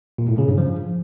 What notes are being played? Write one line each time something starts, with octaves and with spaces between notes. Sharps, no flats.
A#2
A2
C#3
G2
F3